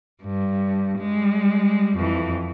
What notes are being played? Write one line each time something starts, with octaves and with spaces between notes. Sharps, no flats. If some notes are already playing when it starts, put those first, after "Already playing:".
G2
G3 G#3
F2 E3